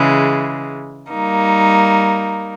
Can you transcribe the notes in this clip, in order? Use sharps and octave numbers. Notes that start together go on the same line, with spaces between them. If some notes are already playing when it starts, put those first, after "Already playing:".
Already playing: C#3 E3 G#3
G3 A#3 D#4